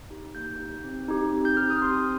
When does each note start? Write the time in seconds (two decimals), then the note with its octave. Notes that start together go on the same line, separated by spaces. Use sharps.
0.10 D#4 G4
0.35 A#3 G6
0.59 D#4 G4
0.84 C4
1.08 D#4 G4
1.33 C4
1.45 G6
1.57 D#4 G4 F6
1.70 D#6
1.82 C4 C6